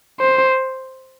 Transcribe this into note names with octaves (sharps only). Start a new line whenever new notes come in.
C5